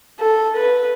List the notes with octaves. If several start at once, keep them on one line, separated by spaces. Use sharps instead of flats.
A4
B4